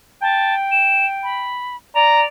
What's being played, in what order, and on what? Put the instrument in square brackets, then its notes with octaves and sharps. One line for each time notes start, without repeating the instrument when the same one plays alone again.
[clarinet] G5 [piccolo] A5
[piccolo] E7
B5
[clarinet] D5 [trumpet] A#5 [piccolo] F7